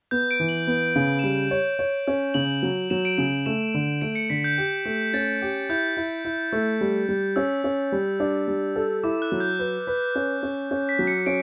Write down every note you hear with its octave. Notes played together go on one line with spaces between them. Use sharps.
B3 G6
D7
E3
F#7
B3
C#3
E7
G3 D7
C#5
C#5
C#4
C#3 F#7
F#3
F#3 E7
D7
C#3 D7
A3 E7
D3
A3 D7
C#7
D3 B6
G6
G4
A3
C#4 A6
G4
E4 G6
E4
E4
A3
G3
G3
C#4 E6
C#4
G3
D4
G3
A4
E4 D6
F#6
F#3
G6
B4
B4
C#4
C#4
C#4
B6
F#3
C#7
C#4 D7